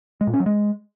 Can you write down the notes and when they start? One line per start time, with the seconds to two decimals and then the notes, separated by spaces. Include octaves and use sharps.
0.21 G#3
0.27 A#2
0.33 C#4
0.40 F#3
0.46 G#3